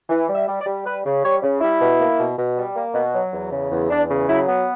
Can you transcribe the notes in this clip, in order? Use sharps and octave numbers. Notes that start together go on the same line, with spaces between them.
E3
G3
E5
G3
D5
G3
G3 B4
C#3
G3 C#5
C#3
G3 E4
B2
A#3
B2
B2
G3
A#3
B2
F#3
E2
C#3
E2
E2 D4
C#3
F#3 E4
B3